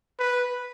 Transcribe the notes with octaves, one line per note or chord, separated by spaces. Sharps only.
B4